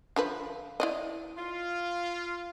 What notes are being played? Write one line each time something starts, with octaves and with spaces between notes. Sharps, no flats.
D3 F3 B4
E4 D5 D#5
F4